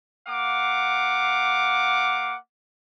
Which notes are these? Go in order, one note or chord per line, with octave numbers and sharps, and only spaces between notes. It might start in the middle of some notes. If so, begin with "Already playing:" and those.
A#3 F5 F#5 D6